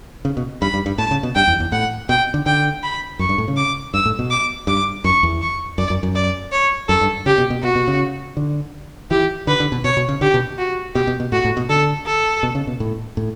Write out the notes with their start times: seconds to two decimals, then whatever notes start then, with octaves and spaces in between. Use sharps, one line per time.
0.25 C#3
0.37 B2
0.61 G2 B5
0.74 G2
0.86 G2
0.98 A2 A5
1.11 C#3
1.23 B2
1.35 G2 G5
1.48 E2
1.60 E2
1.72 A2 F#5
2.09 B2 G5
2.34 D3
2.46 D3 G5
2.83 B5
3.19 F#2 C#6
3.29 G2
3.38 A2
3.48 C#3
3.57 D6
3.94 G2 E6
4.06 A2
4.19 B2
4.30 D6
4.67 G2 D6
5.04 F#2 C#6
5.23 E2
5.42 C#6
5.78 F#2 D5
5.90 F#2
6.03 F#2
6.15 D5
6.52 C#5
6.89 F#2 A4
7.01 G2
7.26 C#3 G4
7.38 B2
7.50 B2
7.63 B2 F#4
7.75 B2
7.88 C#3
8.37 D3
9.10 E3 G4
9.47 D3 B4
9.60 D3
9.72 B2
9.84 B2 C#5
9.97 B2
10.09 C#3
10.21 D3 G4
10.34 B2
10.58 F#4
10.95 B2 G4
11.07 B2
11.20 B2
11.32 A2 F#4
11.45 A2
11.57 B2
11.69 D3 A4
12.06 A4
12.43 B2
12.55 C#3
12.67 B2
12.80 A2
13.17 A2